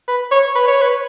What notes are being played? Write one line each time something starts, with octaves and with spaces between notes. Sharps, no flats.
B4
C#5
B4
C#5
B4